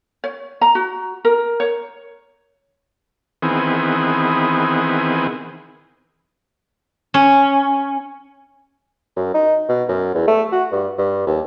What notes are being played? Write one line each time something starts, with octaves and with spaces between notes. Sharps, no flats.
C#5
A#5
F#4
A#4
C#5
D#3 E3 B3 C4 G#4
C#4
F#2
D#4
B2
F#2
E2
A3
F#4
G2
G2
D#2